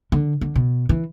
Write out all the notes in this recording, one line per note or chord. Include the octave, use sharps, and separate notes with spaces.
D3
D3
B2
E3